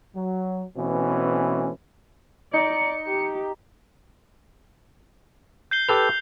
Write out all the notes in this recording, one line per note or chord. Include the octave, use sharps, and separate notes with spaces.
F#3
B2 E3 A3 C4 C#4
D#4 D5 C#7
G4
G6 C7 G7
G4 A4 B4 F7